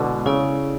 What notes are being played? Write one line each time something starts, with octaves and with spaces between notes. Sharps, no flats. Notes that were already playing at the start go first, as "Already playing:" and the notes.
Already playing: B2 D3 G#3 B3 E4
C#3 C#4 E4 A4 D5